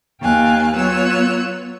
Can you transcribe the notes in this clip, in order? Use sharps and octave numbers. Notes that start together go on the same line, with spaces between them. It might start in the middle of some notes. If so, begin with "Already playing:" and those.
D#2 F5 G5 G#5 F#6
F#3 B3 F4 C#5 E6 F#6